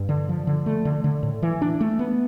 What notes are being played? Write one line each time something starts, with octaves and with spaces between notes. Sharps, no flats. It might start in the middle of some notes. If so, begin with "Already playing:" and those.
Already playing: G2
D3
F3
D3
A3
D3
D3
A2
E3
D4
A3
B3